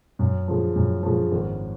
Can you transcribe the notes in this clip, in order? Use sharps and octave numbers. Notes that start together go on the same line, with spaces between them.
F#2
C#3 F3
F#2
C#3 F3
G#1